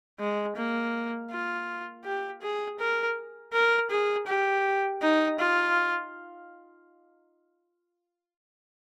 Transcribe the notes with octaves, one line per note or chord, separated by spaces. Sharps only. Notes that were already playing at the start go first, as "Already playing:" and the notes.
G#3
A#3
F4
G4
G#4
A#4
A#4
G#4
G4
D#4
F4